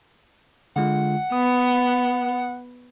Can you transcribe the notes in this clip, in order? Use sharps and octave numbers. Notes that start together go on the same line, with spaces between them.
D3 G#3 F4 F#5
B3 D#6